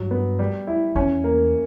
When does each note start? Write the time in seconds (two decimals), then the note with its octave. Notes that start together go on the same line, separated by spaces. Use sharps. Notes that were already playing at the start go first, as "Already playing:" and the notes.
Already playing: G2 F#3
0.11 B3
0.39 G3
0.67 E4
0.95 E2 C#4
1.24 A#3